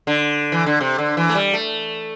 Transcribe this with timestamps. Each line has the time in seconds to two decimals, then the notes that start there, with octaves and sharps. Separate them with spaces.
0.07 D3
0.52 E3
0.66 D3
0.81 C3
0.98 D3
1.17 E3
1.30 A3
1.35 G3
1.53 A3